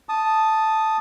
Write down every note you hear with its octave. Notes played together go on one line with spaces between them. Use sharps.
A5 D#6